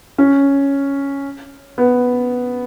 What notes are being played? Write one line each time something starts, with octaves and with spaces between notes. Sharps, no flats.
C#4
B3